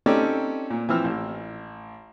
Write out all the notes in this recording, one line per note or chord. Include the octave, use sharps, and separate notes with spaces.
C4 C#4 D#4 G4 A4 D5
A#2
E3 F3 C4 E6 F6
A1